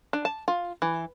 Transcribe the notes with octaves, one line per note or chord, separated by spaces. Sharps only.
D4
A5
F4
E3